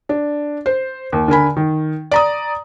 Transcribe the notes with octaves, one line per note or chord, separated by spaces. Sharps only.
D4
C5
D#2
D3 A#4 G#5 B5
D#3
D5 A#5 D#6